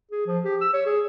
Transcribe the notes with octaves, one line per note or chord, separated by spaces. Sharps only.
G#4
F3
G4
E6
C#5
G#4